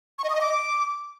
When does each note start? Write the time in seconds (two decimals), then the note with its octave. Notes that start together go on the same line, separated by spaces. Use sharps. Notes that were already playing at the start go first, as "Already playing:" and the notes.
0.18 C#6
0.24 D#5
0.30 D#6
0.35 D#5
0.41 D6